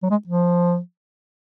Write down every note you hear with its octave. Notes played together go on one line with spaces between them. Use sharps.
F#3
G#3
F3